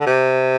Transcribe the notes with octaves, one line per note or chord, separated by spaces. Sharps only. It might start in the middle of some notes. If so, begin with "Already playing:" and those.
D3
C3